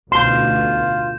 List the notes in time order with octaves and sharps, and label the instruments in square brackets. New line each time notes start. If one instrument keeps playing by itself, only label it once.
[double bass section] A1 D2 B2 [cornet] F4 [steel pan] C6 [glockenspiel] G6 E7